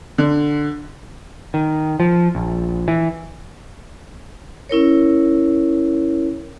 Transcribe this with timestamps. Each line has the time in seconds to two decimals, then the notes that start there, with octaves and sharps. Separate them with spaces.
0.18 D3
1.54 D#3
2.00 F3
2.35 A#1
2.88 E3
4.69 C#4 E4 A#4 C#5